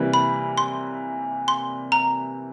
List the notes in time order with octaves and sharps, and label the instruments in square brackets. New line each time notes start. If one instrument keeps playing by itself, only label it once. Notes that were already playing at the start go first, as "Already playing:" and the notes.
Already playing: [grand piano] C3 E3 G3 A#3
[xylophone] B5
C6
C6
A#5